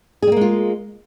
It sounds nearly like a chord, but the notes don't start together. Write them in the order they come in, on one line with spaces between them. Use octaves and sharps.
G#4 G3 A#3 G#3 F4